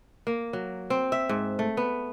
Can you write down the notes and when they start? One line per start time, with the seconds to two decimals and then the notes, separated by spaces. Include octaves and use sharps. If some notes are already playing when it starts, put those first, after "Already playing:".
0.27 A#3
0.53 F#3
0.90 C4
1.12 E5
1.29 G#2
1.59 A3
1.77 B3